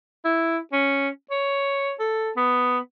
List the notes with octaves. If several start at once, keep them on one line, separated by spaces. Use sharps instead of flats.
E4
C#4
C#5
A4
B3